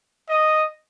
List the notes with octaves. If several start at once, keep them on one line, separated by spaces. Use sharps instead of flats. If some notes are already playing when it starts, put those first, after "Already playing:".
D#5